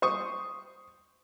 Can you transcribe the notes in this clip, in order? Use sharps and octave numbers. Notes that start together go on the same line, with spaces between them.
C5 C#6 D#6